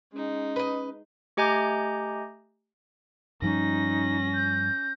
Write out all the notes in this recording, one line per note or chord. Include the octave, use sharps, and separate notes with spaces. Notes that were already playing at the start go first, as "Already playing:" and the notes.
G#3 C#4 D#4
B4 D#5
A3 G4 D#5 G#5 A#5 G6
G2 F3 G3 C#4 D#4 A#6
G6